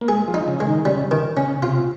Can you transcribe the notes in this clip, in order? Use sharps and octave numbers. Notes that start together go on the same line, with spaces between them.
A#3
G#3 G#4
F3
D#4
C#3
G#3
D#3
C#3 G3
D#3
C#3 C#4
C3 F4